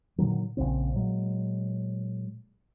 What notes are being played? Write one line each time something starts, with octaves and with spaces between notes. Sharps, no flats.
A#2 D3 D#3 F#3
A#1 D#2 C#3 C4
A#2 F#3 G#3